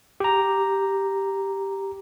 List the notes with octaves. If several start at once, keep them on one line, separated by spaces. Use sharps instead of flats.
G4 A#5